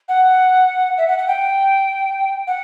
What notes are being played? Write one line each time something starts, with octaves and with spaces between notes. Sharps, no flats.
F#5
E5
F#5
F#5
G5
F#5